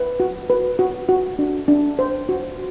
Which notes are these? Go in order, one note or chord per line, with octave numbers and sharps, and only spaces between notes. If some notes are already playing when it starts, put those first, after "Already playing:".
Already playing: B4
F#4
B4
F#4
F#4
D4
D4
C5
F#4